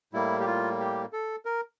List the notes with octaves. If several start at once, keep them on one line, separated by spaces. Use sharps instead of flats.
A2 G3 A#3 E4
G4
F4
G4
A4
A#4